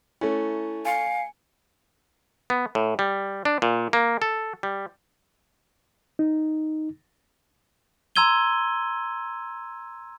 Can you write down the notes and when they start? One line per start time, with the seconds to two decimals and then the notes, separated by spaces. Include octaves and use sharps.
0.21 A3 C#4 E4
0.85 F5 G#5 C#7
2.50 B3
2.75 A2
2.99 G3
3.45 D4
3.62 A#2
3.93 A#3
4.22 A4
4.63 G3
6.19 D#4
8.16 A#5 C6 E6 G#6 D#7 G7